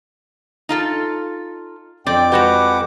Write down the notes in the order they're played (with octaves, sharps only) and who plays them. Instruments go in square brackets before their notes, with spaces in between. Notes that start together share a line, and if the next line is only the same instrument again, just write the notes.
[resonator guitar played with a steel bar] D#4 F4 A4
[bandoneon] F2 D6 [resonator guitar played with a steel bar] C4 D5 [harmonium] G5
[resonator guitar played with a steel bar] G#3 F#4 G4 [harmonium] B4 F#5